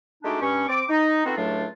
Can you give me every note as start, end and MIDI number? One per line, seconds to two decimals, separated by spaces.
0.24 0.38 56
0.24 0.38 57
0.24 0.38 62
0.24 0.38 63
0.24 0.38 66
0.24 0.38 67
0.41 0.64 43
0.41 0.64 61
0.41 0.64 85
0.68 0.83 60
0.68 0.83 86
0.89 1.24 63
1.25 1.33 57
1.25 1.33 59
1.25 1.33 60
1.25 1.33 63
1.25 1.33 65
1.25 1.33 66
1.37 1.66 37
1.37 1.66 45
1.37 1.66 54
1.37 1.66 57
1.37 1.66 62
1.37 1.66 65